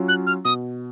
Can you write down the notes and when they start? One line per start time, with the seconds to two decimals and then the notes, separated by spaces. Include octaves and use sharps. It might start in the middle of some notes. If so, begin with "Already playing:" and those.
Already playing: F#3 C#4 F4
0.08 F#6
0.27 F6
0.45 B2 D#6